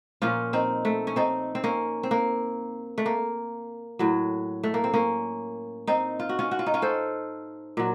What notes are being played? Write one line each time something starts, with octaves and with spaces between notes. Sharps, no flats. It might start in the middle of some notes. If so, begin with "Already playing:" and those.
A#2 F3 C#4 F4
C4 D#4
A3
C#4
C4 D#4
C4
A#3 C#4
C4
A#3
A3
A#3
A2 F#3
A3
A#3
C4
A#3 C#4
C4 D#4
F4
F#4
C#4 F4
F#4
F4
D#4
C#4 F4
A4 C5
A#2 F#3